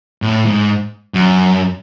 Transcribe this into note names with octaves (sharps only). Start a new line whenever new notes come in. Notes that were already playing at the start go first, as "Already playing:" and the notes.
A2
G#2
F#2